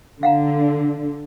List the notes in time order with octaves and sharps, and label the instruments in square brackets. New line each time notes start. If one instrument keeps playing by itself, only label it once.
[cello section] D3 [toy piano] F5 F#5 A#5